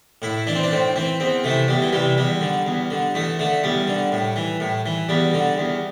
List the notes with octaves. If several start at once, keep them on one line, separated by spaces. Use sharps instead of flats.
A2 E4
E3 D4
C4
D4
A2 C4
E3 C4
E2 C4
C3 E3 A3
E2 G3
E3
C3 E3 G3
E2 G3
D3
E2
D3
E2 A3
D3 A3
E2 G3
D3
A2
E3
A2
E3
E2 G3
D3
E2